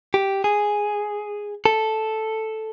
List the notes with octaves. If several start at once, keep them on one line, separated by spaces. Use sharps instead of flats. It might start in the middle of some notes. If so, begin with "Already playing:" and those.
G4
G#4
A4